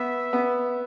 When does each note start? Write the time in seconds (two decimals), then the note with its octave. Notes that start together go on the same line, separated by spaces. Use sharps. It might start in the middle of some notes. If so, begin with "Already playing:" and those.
Already playing: B3 E5
0.33 B3